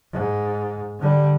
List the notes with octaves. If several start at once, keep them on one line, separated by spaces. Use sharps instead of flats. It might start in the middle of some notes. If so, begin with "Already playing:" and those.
G#2
D3 G3